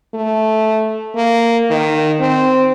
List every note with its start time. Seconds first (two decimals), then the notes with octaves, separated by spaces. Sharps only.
0.15 A3
1.16 A#3
1.71 D#3
2.20 C4